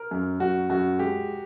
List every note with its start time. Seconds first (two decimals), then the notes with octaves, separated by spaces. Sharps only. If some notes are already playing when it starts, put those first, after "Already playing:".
Already playing: A#4
0.11 F#2
0.40 F#2 F#4
0.70 F#2 F#4
0.99 G#3 G4